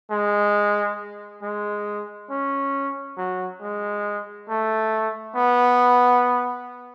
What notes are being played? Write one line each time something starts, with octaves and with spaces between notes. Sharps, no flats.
G#3
G#3
C#4
F#3
G#3
A3
B3